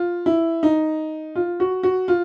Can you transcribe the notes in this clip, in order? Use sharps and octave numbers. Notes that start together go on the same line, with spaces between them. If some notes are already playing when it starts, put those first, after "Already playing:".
Already playing: F4
E4
D#4
F4
F#4
F#4
F4